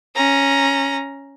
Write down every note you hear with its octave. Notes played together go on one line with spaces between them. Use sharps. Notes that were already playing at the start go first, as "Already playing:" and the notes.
C#4 A#5